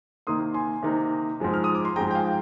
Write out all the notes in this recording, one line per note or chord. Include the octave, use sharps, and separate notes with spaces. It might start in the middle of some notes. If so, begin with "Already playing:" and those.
C3 D#3 A#3 D#4 C6 D#6
G#5 C6
C3 D#3 A#3 D#4
G#2 F3 G#3
F6
D#6
D6
C6
G#2 F3 G#3 G5 A#5
G5
F5 G#5
G5